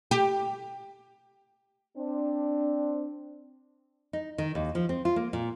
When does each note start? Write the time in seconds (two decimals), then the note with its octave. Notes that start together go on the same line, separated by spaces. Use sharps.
0.11 G4
1.97 C4 D4
4.13 D#4
4.38 D#3
4.55 D#2
4.75 F3
4.89 C4
5.05 F4
5.16 A#3
5.33 A#2